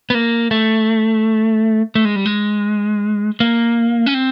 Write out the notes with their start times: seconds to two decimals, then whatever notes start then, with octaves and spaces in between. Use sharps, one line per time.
0.10 B3
0.14 A#3
0.51 A3
1.95 A3
2.05 G#3
2.16 G3
2.25 G#3
3.40 A#3
4.06 C#4
4.14 C4